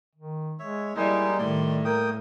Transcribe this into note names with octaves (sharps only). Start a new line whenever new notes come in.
D#3
G#3 C#5 E5
G3 G#3 A#3 D#4 E4
A2 D#3 D5 C6
A#3 A#4 G5 D#6